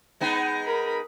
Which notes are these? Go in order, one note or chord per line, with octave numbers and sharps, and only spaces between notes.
G#3 B3 D#4
A#4 B5